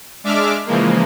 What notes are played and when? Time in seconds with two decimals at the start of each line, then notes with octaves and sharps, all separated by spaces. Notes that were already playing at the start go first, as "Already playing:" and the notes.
0.24 G#3 D4 E5 D6 F6
0.66 C#3 E3 F3 G#3 A#3